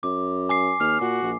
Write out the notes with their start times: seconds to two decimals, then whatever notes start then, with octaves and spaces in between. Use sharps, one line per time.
0.03 F#2 D6
0.49 G#5 D6 C7
0.80 D#2 F6
1.01 A#2 F#4
1.22 A#1